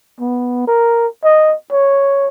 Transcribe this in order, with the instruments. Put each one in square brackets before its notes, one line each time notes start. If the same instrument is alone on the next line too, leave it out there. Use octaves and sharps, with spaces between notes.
[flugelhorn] B3
A#4
D#5
C#5